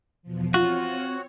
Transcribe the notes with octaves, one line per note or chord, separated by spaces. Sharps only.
E2 B2 F3
C4 F4 F#4 C#5